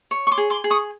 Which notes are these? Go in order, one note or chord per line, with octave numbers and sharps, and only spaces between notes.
C#5
C#6
C6 D6
G#4
C6 D6
G#4
C#6 D#6